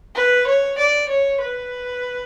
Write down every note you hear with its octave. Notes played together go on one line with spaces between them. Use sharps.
B4
C#5
D5
C#5
B4